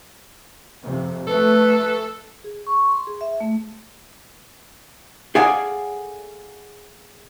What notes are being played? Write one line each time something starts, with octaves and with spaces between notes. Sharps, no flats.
F2 C3
A3 A4 B4
G#4
C#6
C6
G#4
E5
A3
G#4 A4 D5 F5 F#5 G#5